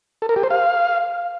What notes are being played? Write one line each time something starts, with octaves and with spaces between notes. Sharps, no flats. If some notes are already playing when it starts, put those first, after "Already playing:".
A4
A#4
G4
C5
F5